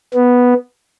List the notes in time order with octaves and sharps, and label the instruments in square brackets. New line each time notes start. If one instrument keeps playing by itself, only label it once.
[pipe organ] B3